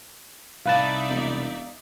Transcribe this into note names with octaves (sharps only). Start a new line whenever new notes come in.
C2 D#4 B4 D5 E5 F5 A5
E1